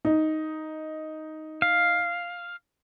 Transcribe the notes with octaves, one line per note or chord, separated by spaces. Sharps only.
D#4
F5